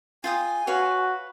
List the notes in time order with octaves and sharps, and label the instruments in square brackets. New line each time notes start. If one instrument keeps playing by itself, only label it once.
[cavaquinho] F4 G5 D#6 [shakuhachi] G#5
[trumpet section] F#4 [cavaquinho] B4 C#5 F5